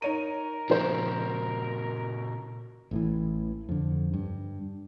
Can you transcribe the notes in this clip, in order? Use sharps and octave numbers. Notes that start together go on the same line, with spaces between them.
D#4 A#4 C#5 D#7
A#2 C#3 F3 C5
A1 A2 E3
F2 D3
G2